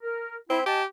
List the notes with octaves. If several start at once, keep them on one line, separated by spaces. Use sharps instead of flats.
A#4
C4 E4
G4 D#5 G#5 A5